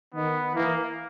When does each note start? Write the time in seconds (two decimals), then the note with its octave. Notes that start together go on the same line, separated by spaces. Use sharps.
0.14 D#3 B3
0.55 E3 A#3